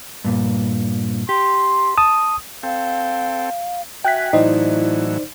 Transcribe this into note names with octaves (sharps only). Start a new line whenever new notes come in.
G2 A#2
G4 C6
A5 D#6
C4 A4 F5 G5
F#4 E5 G5 G#5 F#6 B6
A2 E3 F#3 D#4 E4 C5 D5 D#5